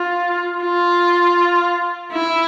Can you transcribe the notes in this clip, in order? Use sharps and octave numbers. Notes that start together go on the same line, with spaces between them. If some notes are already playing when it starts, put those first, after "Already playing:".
Already playing: F4
F4
E4